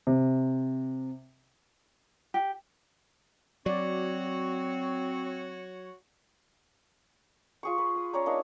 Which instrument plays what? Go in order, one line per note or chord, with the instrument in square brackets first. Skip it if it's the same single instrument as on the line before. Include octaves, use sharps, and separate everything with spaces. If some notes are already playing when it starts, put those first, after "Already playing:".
[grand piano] C3
[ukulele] G4
[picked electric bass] F#3 [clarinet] C4 [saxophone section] F#4 C#5 [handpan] D5
[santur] F4 G#4 C#6
B4
D#6
C#4 C#5 D5 A#5
A#3 D4 D#4